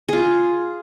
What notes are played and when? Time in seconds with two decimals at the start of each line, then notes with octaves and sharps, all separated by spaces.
0.09 F4 G#4